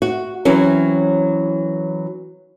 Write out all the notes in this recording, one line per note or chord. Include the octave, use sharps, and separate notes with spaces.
F#4
E3 F#3 C4 C#4